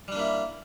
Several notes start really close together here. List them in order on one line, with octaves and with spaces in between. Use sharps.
G3 D4 A#3 E4